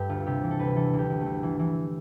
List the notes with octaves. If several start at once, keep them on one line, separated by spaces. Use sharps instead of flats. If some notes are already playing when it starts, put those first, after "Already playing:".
Already playing: G2 G4 A4 B4
D2 F4
C3 G4
E3
A4
D2 B4
E3 A4
D2
G4
D2
D2 A3
E3
E3